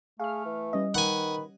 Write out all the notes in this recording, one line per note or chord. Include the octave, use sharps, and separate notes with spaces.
A3 G#4 F5 F6
E3
G3 C#4 D#5
D#3 B4 F#5 G#5